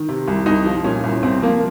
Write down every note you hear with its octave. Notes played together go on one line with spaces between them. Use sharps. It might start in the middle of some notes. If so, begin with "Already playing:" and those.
Already playing: D#3
C3
C2
C2 D#4
F3
A#2 C#4
C2
C2 C4
F3 A#3